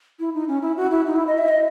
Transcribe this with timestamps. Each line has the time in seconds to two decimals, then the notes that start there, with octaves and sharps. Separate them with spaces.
0.20 E4
0.34 D#4
0.48 C#4
0.62 E4
0.77 F#4
0.91 E4
1.06 D#4
1.16 E4
1.27 D#5
1.38 E5
1.48 D#5